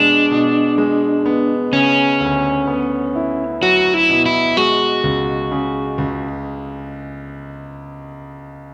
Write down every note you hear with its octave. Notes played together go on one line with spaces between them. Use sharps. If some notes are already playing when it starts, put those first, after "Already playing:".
Already playing: B2 G#3 D4
B2
G#3
B3
C#3 C#4
D2
B3
E4
F#3 F#4
E4
B2
E4
G#3 F#4
C#2
C#3
C#2